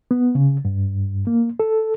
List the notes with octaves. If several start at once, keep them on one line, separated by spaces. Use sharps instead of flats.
B3
C#3
G2
A#3
A4